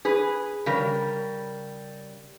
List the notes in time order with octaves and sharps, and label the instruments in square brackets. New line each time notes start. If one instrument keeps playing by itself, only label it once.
[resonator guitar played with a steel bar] G#4 B4
C#3 G3 A#4